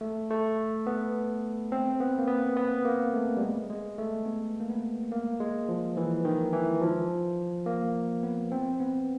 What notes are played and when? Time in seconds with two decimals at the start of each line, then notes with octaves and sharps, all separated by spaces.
0.01 A3
0.30 A3
0.87 B3
1.72 C4
2.00 B3
2.18 A#3
2.28 B3
2.57 B3
2.85 A#3
3.14 A3
3.37 G3
3.41 G#3
3.70 G#3
3.98 A3
4.26 B3
4.60 A#3
4.70 B3
5.12 A#3
5.40 G#3
5.69 F3
5.97 E3
6.25 D#3
6.53 E3
6.81 F3
7.66 A#3
8.23 B3
8.52 C4
8.80 B3